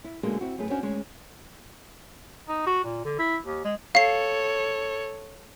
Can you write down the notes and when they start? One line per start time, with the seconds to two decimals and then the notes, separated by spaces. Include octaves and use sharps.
0.04 E4
0.23 F#2 B2 D3 G#3 A#3
0.41 C4 E4 F#4
0.58 F#2 A2 G#4 B4
0.70 C#4 D4 F#4 C5 C#5
0.83 D2 G#3 C#4
2.48 D#4
2.66 F#4
2.84 A#2
3.05 D3
3.19 E4
3.45 D#2
3.64 G#3
3.95 A4 C#5 F5 C7